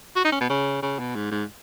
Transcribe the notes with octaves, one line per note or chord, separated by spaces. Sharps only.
F#4
D#4
C#4
B2
C#3
C#3
B2
G#2
G#2